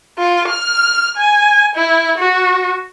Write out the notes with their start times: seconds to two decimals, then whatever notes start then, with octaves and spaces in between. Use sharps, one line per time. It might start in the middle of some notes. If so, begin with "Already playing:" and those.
0.18 F4
0.48 F6
1.17 G#5
1.75 E4
2.18 F#4